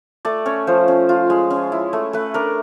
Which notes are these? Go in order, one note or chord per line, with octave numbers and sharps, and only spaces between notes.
A3 D5
C#4 C#5
F3 C5
C#4
F4
G#3
C#4
E4
A3
A3 B4
D4 A#4